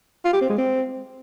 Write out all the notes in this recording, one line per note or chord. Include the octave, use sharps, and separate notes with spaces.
F4
G4
C4
G#3
C4